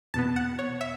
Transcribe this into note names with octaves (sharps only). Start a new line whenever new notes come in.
E2 B2 B3 A5
F#5
C#5
E5